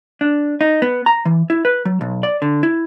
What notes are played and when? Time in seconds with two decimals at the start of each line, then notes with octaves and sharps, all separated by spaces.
0.21 D4
0.61 D#4
0.82 B3
1.06 A#5
1.25 E3
1.50 E4
1.65 B4
1.85 F#3
2.01 B1
2.23 D5
2.42 D3
2.63 E4